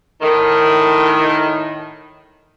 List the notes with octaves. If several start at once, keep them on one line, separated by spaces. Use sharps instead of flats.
A2 D#3